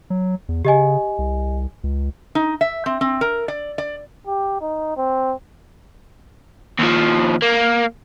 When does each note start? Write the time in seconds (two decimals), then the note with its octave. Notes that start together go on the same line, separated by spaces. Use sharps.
0.10 F#3
0.49 E2
0.65 C#3 G4 D#5 G#5
1.19 C2
1.84 C#2
2.35 D#4
2.61 E5
2.86 C4
3.01 C4
3.21 A#4
3.48 D5
3.78 D5
4.27 G4
4.61 D#4
4.97 C4
6.79 D#2 F3
7.42 A#3